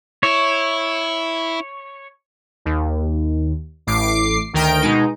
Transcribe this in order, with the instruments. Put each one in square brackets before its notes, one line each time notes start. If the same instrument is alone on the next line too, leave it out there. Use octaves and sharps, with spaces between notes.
[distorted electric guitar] E4 [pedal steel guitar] C#5
[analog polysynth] D#2
A1 A2 D6 C7
D2 D#3 A#4 G5 D7
B2 G#3 D#4